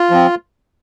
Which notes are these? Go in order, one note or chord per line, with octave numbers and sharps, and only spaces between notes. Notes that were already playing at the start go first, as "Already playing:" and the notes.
Already playing: F4
F3 C4